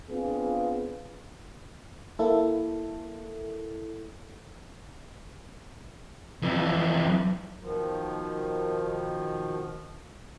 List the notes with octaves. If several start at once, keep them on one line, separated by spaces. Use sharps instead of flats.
B3 C4 D4 F4 G#4 B4
A#3 E4 A4
F2 E3
B2 D#3 F3